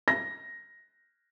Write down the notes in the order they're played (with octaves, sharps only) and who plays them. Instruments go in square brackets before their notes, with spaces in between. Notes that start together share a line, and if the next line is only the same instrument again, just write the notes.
[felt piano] A#6